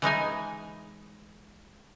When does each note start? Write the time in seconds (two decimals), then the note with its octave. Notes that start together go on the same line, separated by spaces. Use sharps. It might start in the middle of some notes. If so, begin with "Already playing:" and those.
0.02 E3 G#3 D#4 G#5